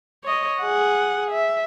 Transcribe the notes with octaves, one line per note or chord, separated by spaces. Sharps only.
C#5 D#5
G#4 F#5
E5